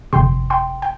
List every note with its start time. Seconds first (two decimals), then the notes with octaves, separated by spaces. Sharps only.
0.13 G1 F2 C3 G5 C6
0.50 G5 C6
0.82 G5